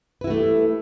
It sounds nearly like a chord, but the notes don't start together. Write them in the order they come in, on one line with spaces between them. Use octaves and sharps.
B4 E4 F#4 A3 G4